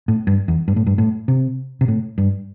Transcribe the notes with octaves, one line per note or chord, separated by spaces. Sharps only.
A2
G2
E2
G2
A2
G2
A2
C3
C3
A2
G2